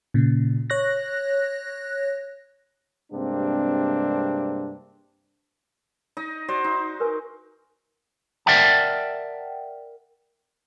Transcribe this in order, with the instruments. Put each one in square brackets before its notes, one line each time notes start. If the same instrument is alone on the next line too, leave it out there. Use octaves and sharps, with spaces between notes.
[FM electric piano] A#2 C#3
C#5 F#6 A#6
[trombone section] G2 C3 G#3 A#3 C4 D4
[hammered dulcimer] D#4 D#5
F#4 C5 D5
D#4
[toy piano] A#4 B4 G#5
[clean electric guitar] A#4 D5 E5 F#5 G5 A5